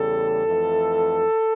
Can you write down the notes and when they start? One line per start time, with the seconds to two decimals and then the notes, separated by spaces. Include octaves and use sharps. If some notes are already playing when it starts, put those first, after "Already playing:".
Already playing: E2 C#3 G3 A4
0.46 F2 E3 A3